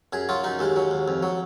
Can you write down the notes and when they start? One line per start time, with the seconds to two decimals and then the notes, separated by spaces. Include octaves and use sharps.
0.13 F#2 G#4
0.29 F#3 F4
0.44 F#2 D#4
0.59 D#2 G#3
0.76 F#3
0.91 D#2
1.08 F2
1.23 F#3